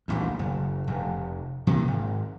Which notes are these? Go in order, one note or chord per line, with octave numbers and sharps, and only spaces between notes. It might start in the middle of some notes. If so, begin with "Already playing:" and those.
D#1 A1 D2
F#1
F1
C3 E3 A#3
G#1